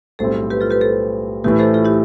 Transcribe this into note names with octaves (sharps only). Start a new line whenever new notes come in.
B1 A2 G3 C4 A4 C5
G4 B4
F4 A4
G4 B4
A4 C5
A2 E3 A3 G4 B4
A4 C5
F4 A4
E4 G4